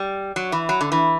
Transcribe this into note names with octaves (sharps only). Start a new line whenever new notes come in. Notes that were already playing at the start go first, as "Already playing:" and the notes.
Already playing: G3
F#3
E3
F#3
D3
E3